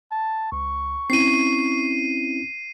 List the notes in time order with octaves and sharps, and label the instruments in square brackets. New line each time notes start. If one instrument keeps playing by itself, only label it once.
[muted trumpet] A5
[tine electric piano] C#2 [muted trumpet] C#6
[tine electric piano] C4 C#4 E4 [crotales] C7 D#7